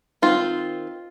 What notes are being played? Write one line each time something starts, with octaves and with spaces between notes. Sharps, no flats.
D#3 C4 D#4 F4